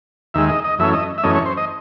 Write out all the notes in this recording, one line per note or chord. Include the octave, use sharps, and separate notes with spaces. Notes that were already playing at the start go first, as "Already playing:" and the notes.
D#2 D#3 G#3 E5
D#5
D#5
F#2 E3 A3 C#4 E5
D#5
E5
F#2 E3 A3 C#4 D#5
C#5
C5
D#5